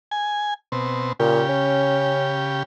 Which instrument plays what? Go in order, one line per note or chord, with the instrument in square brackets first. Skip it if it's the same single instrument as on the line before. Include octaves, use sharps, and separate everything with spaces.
[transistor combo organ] G#5
B2 C4
[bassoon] A#2 [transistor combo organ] C#3 G4
[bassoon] C#4